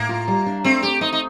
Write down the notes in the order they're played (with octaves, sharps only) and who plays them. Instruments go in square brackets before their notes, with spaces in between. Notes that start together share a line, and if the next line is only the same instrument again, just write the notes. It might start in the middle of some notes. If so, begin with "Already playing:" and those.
Already playing: [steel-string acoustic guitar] A2 [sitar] A#3
[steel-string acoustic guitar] F4
G3
D4
[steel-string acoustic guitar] A3 [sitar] C4
[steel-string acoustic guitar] A3 [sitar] G4
[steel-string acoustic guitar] C4 [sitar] D#4
[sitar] D#4